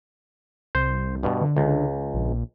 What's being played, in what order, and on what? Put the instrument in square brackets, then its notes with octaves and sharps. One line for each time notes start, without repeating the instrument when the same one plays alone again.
[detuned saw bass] C2 [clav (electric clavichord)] C5
[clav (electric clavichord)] G2 B2
[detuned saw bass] D3
[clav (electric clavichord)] C#2
[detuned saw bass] A#1